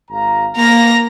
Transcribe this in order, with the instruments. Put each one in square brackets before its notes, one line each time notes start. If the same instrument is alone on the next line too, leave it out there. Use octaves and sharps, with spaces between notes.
[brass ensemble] G#1 F5 A#5
[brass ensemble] A#3 [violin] A#5 A#6